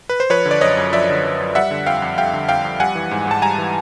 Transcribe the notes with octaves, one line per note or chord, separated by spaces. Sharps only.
B4
C5
F3 B4 C#5
D3
D5
F#2 C#5 D#5
F#2
F3 D5 E5
D3
F#2
F#2
G3 E5 F#5
D3
F2 F5 G5
F2
G3 F5 G5
D3
F2 F5 G5
F2
G3 F#5 G#5
E3
G#2
G#2 A5
G3 G#5 A#5
E3